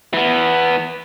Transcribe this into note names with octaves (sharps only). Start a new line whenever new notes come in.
E3 B3